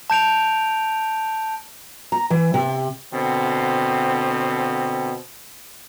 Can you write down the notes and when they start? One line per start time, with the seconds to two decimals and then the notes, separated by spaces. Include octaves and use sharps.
0.10 A5 G6 D7 F7
2.12 A#5
2.30 E3
2.54 C3
3.13 B2 D3 C4